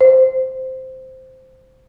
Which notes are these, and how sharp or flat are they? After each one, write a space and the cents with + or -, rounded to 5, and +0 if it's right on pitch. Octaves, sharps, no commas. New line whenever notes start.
C5 -5